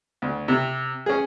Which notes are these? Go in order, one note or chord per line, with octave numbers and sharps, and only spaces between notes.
D2
C3
C#4 G#4